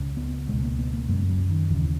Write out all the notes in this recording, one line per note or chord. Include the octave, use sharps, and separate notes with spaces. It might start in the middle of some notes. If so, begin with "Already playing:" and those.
Already playing: C#2 C#3
B3
C#2 B2 G#3
A#3
B3
A#3
F#2 C#3 G#3
F#3
D#3
D#2 C#3 E3